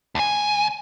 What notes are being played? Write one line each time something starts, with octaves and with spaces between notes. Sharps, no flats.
D2 G#5